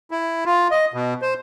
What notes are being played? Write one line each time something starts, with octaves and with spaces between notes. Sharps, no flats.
E4
F4
D#5
B2
C5